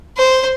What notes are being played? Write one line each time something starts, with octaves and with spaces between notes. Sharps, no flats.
C5